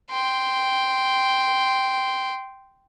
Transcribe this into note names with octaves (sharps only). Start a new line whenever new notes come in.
G5 C6